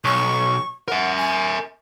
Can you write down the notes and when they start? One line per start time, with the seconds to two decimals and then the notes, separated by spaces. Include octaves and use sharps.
0.04 B1 C#6
0.88 A#4 E5 F#5
1.17 G#5